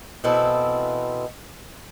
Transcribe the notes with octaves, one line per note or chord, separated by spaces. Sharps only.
B2 E3 C4 E4 A4